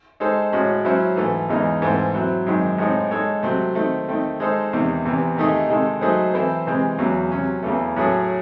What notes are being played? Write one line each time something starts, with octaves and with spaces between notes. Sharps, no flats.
G#3 D#4 A4 C5
A2 G#3 C#4 F#4
F#3 C#4 E4 C5
G#2 E3 A3
E2 C#3 E3 G#3 D#4
G#2 E3 A3 C4
F#3 C4 E4
F#2 D#3 G#3 C4
A2 G#3 C4 D#4
G#3 D#4 A4 C#5
C3 F#3 A3 C4
D#3 A3 C4
D#3 A3 C4
G#3 D#4 A4 C5
E2 C3 D#3
E2 C3 E3
C3 D#3 A3 D#4 G#4
C3 D#3 G#3 D#4 A4
F#3 A3 D#4 G#4 C5
E3 C4 E4 A4 C5
C3 E3 G#3 C4
E2 C#3 F#3 C#4
C3 F#3 C#4
E2 C#3 E3 A3
A2 F#3 A3 C#4 G#4